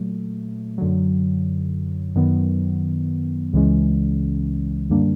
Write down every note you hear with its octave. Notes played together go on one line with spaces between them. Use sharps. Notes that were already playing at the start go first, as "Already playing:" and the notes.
Already playing: A#2 F#3 A3
F#2 D3 F#3
F#2 D#3 F#3 B3
C#2 C#3 E3 G#3 C#4
F#2 D3 G3 A#3 D4